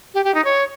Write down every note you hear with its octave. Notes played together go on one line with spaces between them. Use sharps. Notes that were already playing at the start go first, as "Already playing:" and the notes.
G4
G4
D#4
C#5